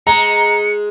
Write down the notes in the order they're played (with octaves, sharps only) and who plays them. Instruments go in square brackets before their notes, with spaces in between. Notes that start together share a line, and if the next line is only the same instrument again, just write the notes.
[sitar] G#3 [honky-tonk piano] A#5 [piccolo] C#7